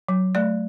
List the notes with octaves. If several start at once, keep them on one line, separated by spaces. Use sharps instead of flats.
F#3
A3 D5